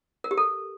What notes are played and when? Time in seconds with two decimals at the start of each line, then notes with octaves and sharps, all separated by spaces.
0.24 A#4
0.31 G4
0.37 A4